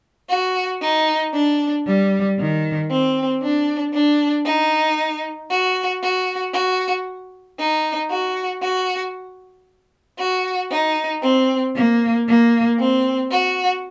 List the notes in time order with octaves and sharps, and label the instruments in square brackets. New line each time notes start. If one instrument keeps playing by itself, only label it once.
[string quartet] F#4
D#4
D4
G3
D#3
C4
D4
D4
D#4
F#4
F#4
F#4
D#4
F#4
F#4
F#4
D#4
C4
A#3
A#3
C4
F#4